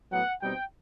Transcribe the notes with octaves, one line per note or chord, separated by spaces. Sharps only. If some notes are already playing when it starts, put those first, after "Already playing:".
A2 F#3 B3 F#5
B2 G3 C4 D#4 G5